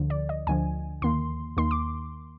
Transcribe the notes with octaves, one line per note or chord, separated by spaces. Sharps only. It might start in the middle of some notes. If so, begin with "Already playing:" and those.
Already playing: D2 D3 F3
D5
D#5
D2 D3 F3 G#5
D#2 D#3 A#3 C6
D#2 D#3 A#3 C6
D6